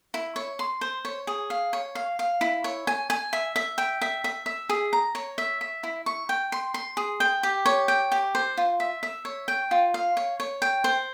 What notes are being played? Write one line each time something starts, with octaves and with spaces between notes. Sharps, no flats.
E4
C#5
C6
C5
C#5
G#4
F5
C#5
F5
F5
E4
C#5
G#5
G#5
E5
E5
G5
E5
E5
E5
G#4
A#5
C#5
E5
E5
E4
C#6
G5
C6
C6
G#4
G5
G4
C#5
G5
G4
C5
F4
E5
E5
C#5
G5
F4
F5
C#5
C#5
G5
C5